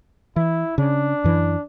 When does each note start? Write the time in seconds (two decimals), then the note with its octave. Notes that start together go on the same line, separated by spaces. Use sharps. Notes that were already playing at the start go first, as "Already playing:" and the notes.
0.36 E3 E4
0.78 C#3 D4
1.24 F#2 E3